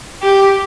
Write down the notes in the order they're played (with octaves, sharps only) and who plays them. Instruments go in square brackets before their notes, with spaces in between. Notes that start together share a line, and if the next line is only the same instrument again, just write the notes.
[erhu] G4